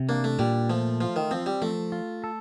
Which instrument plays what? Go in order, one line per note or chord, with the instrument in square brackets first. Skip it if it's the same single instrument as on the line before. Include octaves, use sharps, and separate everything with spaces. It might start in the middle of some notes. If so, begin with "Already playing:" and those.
Already playing: [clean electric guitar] C3
[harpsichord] A#3 [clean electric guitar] D4
[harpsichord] A3
[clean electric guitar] A#2 [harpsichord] G3
[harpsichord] F3 [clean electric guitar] A3
[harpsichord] F3 [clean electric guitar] F4
[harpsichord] D#3
[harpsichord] F3 [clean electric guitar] C4
[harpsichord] G3
[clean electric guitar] F3 [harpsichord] A3
[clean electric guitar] F4
A4